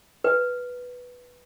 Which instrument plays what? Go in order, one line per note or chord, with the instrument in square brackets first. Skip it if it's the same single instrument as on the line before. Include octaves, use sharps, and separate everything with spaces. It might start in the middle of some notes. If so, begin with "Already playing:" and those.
[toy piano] B4